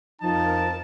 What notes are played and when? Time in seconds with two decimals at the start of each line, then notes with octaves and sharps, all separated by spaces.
0.21 F2 F3 D#4 A#4 A5